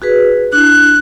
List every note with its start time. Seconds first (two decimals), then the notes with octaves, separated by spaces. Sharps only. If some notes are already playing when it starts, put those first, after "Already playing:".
0.02 F#4 G#4 B4
0.52 D4 E4 F#6